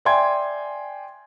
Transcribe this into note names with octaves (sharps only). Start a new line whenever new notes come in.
D5 E5 G5 G#5 C6 G#6